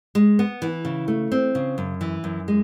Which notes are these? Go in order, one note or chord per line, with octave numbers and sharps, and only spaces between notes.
G#3
B3
E3
C#3
A3
C4
C#3
F#2
E3
F#2
G#3